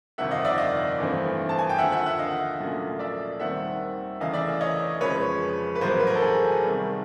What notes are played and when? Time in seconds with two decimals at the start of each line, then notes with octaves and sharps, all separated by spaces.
0.18 G1 F2 C3 D#3 E5 F#5
0.31 D#5 F5
0.45 D5 E5
0.58 D#5 F5
0.99 G#1 G2 E3 A3 C4
1.49 A5
1.59 G#5
1.69 G5
1.78 D#2 D3 F3 E5 F#5
1.92 E5 F#5
2.06 E5 F#5
2.19 D#5 F5
2.60 A#1 A#2 F#3 A3 C#4
2.99 D5 E5
3.40 D#2 D#3 G3 C4 E5 F#5
4.20 E2 C#3 E3 A3 C#4 D#5 F5
4.34 D5 E5
4.61 C#5 D#5
5.01 F2 C#3 F3 G#3 B4 C#5
5.75 B4
5.81 A1 A2 F#3 B3 A#4 C5
6.00 B4
6.07 A#4
6.15 A4
6.22 G#4
6.62 C2 C3 D#3 G3